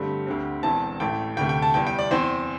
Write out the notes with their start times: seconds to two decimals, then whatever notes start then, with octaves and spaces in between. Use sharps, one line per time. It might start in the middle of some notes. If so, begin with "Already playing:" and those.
Already playing: G2 D3 A3 C4 G4
0.27 D2 D3 C4
0.63 E1 E2 E3 C4 A5
1.00 A1 A2 A3 G5
1.37 D2 C3 A3 G5
1.49 G5
1.62 A5
1.74 E2 E3 G3 G5
1.87 G5
1.99 D5
2.11 E2 E3 C4 C5